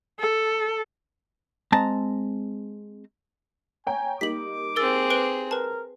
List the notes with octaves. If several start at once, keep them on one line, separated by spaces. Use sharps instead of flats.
A4
G#3 C4 A5 A#5
C#5 G5 G#5 A#5
G3 A#3 D#4 D6 B6 F#7
C4 G#4 A#4 E6 A6
B4 D7 G7
A#4 B4 A5